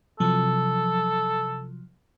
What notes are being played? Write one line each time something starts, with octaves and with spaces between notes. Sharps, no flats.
C3 F3 F#3 A4